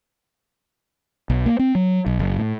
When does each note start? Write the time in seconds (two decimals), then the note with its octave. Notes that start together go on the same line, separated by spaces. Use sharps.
1.30 B1
1.46 A#3
1.59 C4
1.75 F#3
2.06 B1
2.19 F#1
2.38 A2